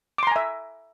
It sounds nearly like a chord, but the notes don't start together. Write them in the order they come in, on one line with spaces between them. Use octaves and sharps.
D6 C6 A#5 G#5 E5